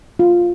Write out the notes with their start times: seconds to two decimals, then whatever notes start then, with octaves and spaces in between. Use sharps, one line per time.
0.19 F4